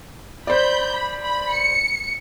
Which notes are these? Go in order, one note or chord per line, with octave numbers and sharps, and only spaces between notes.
C5 D5 B5 G6
B5
B5
C#7